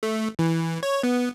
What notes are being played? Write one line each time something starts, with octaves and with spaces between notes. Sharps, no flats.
A3
E3
C#5
B3